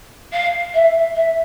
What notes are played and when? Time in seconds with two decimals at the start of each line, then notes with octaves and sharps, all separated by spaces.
0.32 F5
0.74 E5
1.15 E5